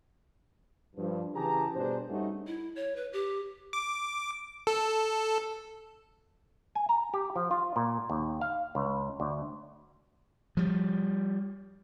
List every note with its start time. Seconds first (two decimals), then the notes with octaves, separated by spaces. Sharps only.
0.96 G2 F3
1.35 C#3 E3 G4 G#4 A5 A#5
1.76 G2 B2 D4 G4 G#4 C5
2.08 G2 G3 A3 C#4 D#4 F#4
2.47 E4
2.76 C#5
2.96 B4
3.13 G4
3.73 D6
4.67 A4
6.75 G#5
6.89 A#5
7.14 G4
7.36 F3
7.51 F4
7.76 A#2
8.10 D#2
8.41 F5
8.75 C#2
9.20 D2
10.57 F3 G3